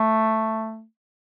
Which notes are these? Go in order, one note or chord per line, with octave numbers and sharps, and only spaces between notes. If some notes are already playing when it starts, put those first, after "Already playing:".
Already playing: A3